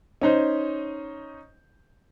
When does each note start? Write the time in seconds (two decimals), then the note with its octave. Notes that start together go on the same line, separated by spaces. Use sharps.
0.22 C#4 D#4 C5